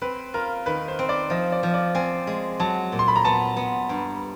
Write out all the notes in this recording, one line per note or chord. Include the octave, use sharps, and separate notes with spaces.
C4 B4
F4 A#4
D#3 B4
C5
C4
D5
F3 D#5
D5
F3
D5
C4 G#5
G#3
F#3 A5
A#2
C6
B5
A#5
B3 A5
B3
G2